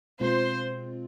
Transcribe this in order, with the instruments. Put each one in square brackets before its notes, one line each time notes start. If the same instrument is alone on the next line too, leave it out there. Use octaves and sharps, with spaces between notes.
[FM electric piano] B2 G#3 C4 F4 [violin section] C5